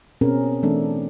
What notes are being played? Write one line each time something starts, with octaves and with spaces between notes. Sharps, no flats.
B2 C4 C#4 G#4 A#4
E3 A3 C4 D4 A4